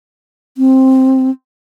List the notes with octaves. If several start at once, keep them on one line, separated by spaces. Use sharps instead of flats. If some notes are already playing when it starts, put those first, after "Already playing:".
C4